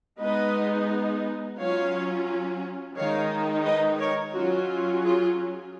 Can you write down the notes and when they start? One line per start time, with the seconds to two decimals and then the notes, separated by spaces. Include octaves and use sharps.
0.20 G#3 B3 D#4 B4 D#5
1.58 F#3 C#4 F4 C#5 F5
2.96 D#3 G#3 D#4 C#5 F5
3.65 B4 D#5
3.99 A#4 C#5
4.34 F#3 C#4 F4 F#4
5.03 F4 G#4